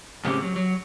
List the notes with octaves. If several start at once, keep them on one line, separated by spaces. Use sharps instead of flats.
A2 C#3 G#3 C4 C#4 G4
F#3
F#3